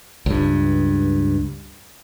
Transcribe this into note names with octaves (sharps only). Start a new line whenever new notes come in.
C#2 G2